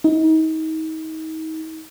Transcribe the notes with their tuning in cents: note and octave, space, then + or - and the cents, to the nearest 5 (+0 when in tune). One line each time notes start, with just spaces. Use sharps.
D#4 +35